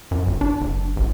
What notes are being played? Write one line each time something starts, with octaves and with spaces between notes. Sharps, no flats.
F#2
G1
D4
F#1
A1